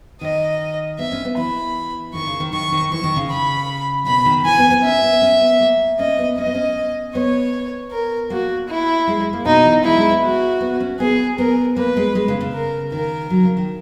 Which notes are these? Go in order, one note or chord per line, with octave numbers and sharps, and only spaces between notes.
D#3 D#5
B3 E5
C#4
B3
E3 B5
D#3 C#6
C#3
D#3
D#3 C#6
D#3
E3 C#6
D#3
C#3
B5
B2 B5
D#3
E3 G#5
B3
B3
C#4 E5
B3
C#4
B3
A#3
C#4 D#5
B3
C#4 D#5
B3
C#4
B3 C#5
A#4
A#3 F#4
E4
G#3
G#3
A#3
B2 D#4
E3
G#3 E4
G#3
B3
F#4
B3
C#4
B3 G#4
B3 A#4
A#3 B4
G#3
G#3
C#3
C#3
A#4
D#3 A#4
F#3
C#3
D#3